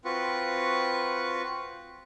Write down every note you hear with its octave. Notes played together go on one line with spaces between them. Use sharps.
C4 F4 F#4 B4 C#6